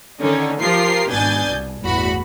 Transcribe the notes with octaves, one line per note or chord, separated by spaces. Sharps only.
D3 D#3 C#4 D#4
F3 F4 G4 A#4 C7
G#1 B2 D4 G#5 G6 A6
C2
G1 E2 A2 F#4 B5